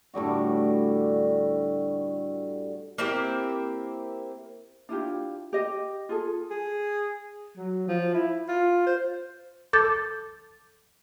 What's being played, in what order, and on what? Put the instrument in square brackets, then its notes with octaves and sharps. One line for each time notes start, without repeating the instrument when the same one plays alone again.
[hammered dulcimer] A2 D3 G3 F#4
[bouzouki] A#3 C4 E4 G4
[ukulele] D4 E4 F4 G4
G4 D#5
F4 G#4 A4
[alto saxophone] G#4
F#3
F3
E4
F4
C5
[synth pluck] A4 [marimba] D6 G6 A6